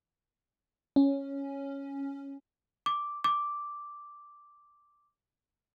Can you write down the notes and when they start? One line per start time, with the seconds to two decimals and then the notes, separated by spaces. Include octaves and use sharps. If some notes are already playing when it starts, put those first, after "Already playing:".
0.96 C#4
2.86 D6
3.24 D6